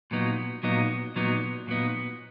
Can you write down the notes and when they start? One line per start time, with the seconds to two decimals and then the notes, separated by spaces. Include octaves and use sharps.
0.11 A#2 F#3 B3 D#4
0.63 A#2 F#3 B3 D#4
1.16 A#2 F#3 B3 D#4
1.67 A#2 F#3 B3 D#4